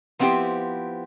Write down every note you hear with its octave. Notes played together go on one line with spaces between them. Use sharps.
F3 B3 C4 E4 G4